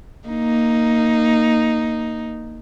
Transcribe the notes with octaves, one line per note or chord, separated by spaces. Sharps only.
A#3 D#4